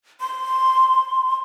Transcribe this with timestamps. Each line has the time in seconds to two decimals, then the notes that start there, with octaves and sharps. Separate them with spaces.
0.21 C6